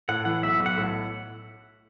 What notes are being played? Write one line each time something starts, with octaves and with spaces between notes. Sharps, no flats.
A2 F#5
E3 F#5
B1 E5
B1
F#5
A2